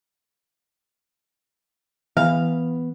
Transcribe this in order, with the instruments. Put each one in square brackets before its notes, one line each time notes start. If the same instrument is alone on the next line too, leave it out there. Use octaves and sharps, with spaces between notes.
[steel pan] E3 [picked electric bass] B3 [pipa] F5